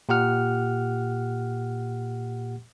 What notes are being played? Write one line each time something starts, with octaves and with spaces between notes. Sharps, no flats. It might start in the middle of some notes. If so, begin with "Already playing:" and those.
A#2 G4 F#5 F6